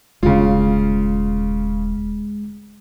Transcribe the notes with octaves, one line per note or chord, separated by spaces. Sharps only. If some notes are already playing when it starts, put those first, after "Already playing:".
D#1 C#3 G#3 F4